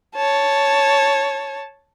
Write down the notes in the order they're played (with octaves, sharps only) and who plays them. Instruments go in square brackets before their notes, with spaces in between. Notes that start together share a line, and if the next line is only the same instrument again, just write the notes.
[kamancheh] C#5 A5